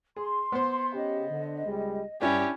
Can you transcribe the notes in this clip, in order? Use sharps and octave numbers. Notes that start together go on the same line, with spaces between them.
G#4 C6
B3 C5
C#3 G4 D#5
D3
C#2 G3 G#3
G2 C#4 D4 E4 G4